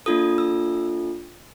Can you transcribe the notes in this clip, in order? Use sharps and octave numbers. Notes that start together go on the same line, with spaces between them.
A#3 D4 F4 A4 D#6
E6